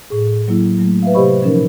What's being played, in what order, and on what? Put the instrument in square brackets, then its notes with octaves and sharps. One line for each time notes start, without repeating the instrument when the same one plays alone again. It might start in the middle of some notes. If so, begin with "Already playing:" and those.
[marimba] A2 G#4
F#3 A#3 E4
F#3 A3
B4 E5 F5
C3 G4 C5 D#5 B5 C#6
A#2 E3 F3 C#4 D#4 A#4